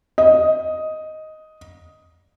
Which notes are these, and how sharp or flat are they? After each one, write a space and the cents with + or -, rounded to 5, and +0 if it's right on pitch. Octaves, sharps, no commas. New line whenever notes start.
D#5 +5